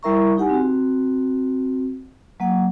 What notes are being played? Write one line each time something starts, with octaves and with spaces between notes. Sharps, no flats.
G3 E4 A#4 E5 A#5 C#6
D#4 G4 F#5 G#5
C4 F#4
F#3 A#3 F#5